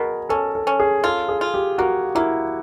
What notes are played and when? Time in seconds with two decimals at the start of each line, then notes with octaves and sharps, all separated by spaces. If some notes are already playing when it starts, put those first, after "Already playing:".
Already playing: B2 G#4 A#4
0.29 C#4 A4
0.55 A4
0.67 C#4
0.80 G#4
1.04 F4 A4
1.28 G#4
1.41 F4
1.54 G4
1.78 A#3 F#4
2.15 A#3 E4